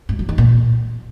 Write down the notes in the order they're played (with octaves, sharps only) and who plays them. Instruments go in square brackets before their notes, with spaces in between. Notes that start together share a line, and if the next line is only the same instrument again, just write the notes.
[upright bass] G#2
F#3
D#3
A#2